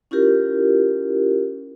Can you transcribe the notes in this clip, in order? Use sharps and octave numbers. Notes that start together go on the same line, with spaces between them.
C#4 E4 F4 G4 A#4